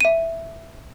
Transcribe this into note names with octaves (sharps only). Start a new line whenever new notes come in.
E5 D#7